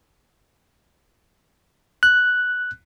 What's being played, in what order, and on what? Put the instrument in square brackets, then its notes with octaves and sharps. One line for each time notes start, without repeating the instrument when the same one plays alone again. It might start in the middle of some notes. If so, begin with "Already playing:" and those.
[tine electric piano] F#6